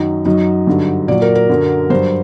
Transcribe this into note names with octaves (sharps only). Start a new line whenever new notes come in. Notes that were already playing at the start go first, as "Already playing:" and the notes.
Already playing: F#2 D#3 F#3 D#4
F#2 F#3 D#4
G2 D3 F#3
A#2 F#3 D5
A#4
A#4
F#2 D3 F#3
G2 F#3 C5